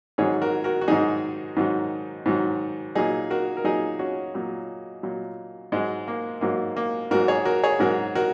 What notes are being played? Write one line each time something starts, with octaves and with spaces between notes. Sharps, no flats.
G#2 D#3 F#3 G#4 C#5
F#4 A#4
F#4 A#4
F#4
G#2 D#3 F#3 D#4 G#4
G#2 D#3 F#3
G#2 D#3 F#3
A#2 F#3 D#4 G#4
F#4 A#4
A#4
A#2 F#3 D#4 G#4
C#4 F#4
A#2 F#3
A#2 F#3
G#2 F#3 G#3
A#3
G#2 F#3 A#3
A#3
G#2 F#3 F#4 A#4
G#4 C#5
F#4 A#4
G#4 C#5
G#2 F#3 F#4 A#4
F#4 A#4